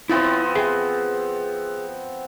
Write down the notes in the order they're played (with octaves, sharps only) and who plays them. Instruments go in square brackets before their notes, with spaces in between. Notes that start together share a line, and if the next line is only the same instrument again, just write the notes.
[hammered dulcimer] F3 B3 C4 [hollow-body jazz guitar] E4 C#5
[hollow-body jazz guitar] G#4 E5 G5